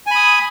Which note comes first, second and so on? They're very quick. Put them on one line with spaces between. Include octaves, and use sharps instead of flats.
G#5 B5 D#6